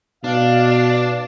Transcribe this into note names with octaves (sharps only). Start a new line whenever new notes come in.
B2 D4 F5